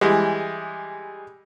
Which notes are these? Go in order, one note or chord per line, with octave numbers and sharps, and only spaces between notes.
E3 G3 G#3